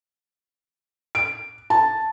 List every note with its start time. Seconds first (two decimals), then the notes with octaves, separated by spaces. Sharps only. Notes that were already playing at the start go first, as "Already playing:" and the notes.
1.15 D7
1.70 A5